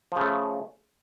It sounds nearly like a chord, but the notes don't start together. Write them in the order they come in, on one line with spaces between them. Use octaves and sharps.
F3 C#3 A3